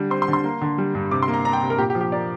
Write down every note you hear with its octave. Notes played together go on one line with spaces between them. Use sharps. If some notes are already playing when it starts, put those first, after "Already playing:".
Already playing: D3 G3
C4 C6
C6
D3
C6
A#3
D3
G3
G2
C3 D6
C6
A#3
A#5
D4 A#5
G5
C3
A#4
A#2 G4
G4
F3
G4
A#3 D5